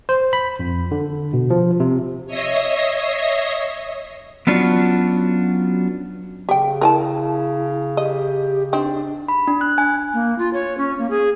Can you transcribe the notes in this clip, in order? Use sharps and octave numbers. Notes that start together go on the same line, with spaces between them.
C5
B5
F2
D3
B2
F3
C3
C#5 D#5 E5 D#6 A#6 C7
F#3 B3 C#4 D4 F4 F#4
C#3 G4 G5
E4 A#4 G#5 A5
G4 D#5
C4 D4 D#4
B5
D4
F#6
G#5
A#3
F4
C#5
C#4
A#3
G#4